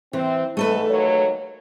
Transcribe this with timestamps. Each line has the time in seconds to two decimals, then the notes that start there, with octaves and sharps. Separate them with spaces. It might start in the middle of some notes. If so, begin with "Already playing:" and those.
0.13 E3 C4
0.57 G#2 A3 A4 B4
0.90 D#2 F#3 C#5